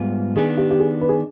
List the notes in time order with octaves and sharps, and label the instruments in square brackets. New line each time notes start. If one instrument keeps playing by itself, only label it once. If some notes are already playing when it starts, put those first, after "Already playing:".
Already playing: [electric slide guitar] G#2 G3 B3 F4
[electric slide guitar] D#3 B3 D4 [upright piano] G#4
[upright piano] G4
G4
G#4
B4
G#4